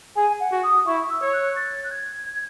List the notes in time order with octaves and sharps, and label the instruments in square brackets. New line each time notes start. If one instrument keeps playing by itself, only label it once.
[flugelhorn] G#4 [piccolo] G#5
[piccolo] F#5
[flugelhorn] F#4
[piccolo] D#6
[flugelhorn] E4 [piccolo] C#6
[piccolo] E6
[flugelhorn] C#5
[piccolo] F#6
A6
F#6
G#6